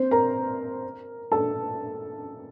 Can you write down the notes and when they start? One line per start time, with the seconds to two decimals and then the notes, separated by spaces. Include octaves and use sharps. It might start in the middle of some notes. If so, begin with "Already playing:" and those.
Already playing: C4 C5
0.11 A#4 A#5
1.32 A4 A5